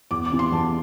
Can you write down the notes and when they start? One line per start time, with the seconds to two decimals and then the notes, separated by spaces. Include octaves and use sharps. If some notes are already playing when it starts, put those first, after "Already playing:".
0.11 E2 D6
0.25 D6
0.32 C3 E3
0.39 C6
0.52 E2 A5